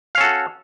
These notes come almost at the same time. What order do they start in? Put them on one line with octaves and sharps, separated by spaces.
F5 C#4 A4 F#4